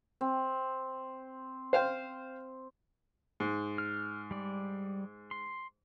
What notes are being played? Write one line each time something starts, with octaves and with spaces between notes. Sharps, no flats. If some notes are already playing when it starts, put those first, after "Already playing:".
C4
C5 F5 G5
G#2
F6
G3 D5
C6